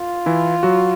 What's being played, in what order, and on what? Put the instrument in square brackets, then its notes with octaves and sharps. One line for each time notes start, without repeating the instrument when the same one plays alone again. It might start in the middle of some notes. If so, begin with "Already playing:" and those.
Already playing: [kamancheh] F4
[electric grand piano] E3 E4
F#3 F#4